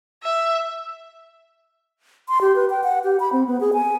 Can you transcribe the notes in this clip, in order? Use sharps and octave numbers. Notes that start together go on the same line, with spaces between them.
E5
C6
G4
B4
G5
F#5
G4
B5
C4
B3
G#4
G#5